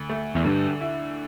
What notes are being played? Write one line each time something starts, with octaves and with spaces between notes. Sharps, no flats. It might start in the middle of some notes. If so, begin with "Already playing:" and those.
Already playing: D2
A3
E2
G2 D3
E4